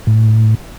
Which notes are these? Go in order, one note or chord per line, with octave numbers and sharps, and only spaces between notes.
A2